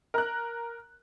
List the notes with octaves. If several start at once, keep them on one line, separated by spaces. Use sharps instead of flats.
A#4 F#6